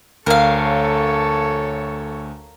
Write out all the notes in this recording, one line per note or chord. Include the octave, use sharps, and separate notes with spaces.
D2 A4 A#4 C#5 F5